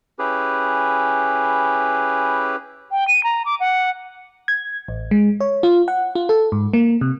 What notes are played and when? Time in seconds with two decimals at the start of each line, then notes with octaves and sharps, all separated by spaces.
0.19 C#4 E4 G4 G#4 B4
2.91 G5
3.08 D#7
3.23 A#5
3.45 D6
3.60 F#5
4.48 G#6
4.88 A1
5.11 G#3
5.40 C#5
5.63 F4
5.88 F#5
6.15 F4
6.29 A4
6.52 G#2
6.73 A#3
7.01 C3